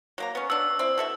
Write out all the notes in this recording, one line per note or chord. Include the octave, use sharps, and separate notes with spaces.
F#3 A#3 A#5
B3 C#4
B3 D4 E6
C4 E4
B2 A4 E5